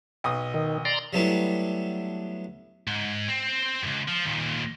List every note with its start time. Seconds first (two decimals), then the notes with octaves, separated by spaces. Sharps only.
0.24 B1 D#6
0.54 D#3
0.85 D5 A#5 C6
1.13 F#3 G3 A3 B3 D4 E4
2.87 G#2
3.29 C4
3.84 C#2 F#2
4.08 F3
4.26 D#2 A#2